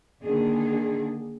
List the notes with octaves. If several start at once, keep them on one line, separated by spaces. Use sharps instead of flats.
D3 D#3 A#3 D4 G#4